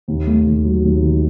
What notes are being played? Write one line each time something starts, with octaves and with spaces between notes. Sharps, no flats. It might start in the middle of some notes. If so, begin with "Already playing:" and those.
D#2
A3
D#2
F#3
D#2
D#3